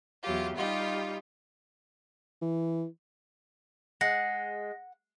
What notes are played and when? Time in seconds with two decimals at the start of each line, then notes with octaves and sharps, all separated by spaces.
0.22 E2 F#3 F4 G4
0.57 G3 D#4 F4 G4
2.41 E3
4.01 G#3 F#5 A#6